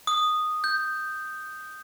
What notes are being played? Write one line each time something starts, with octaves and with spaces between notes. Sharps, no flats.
D#6
G6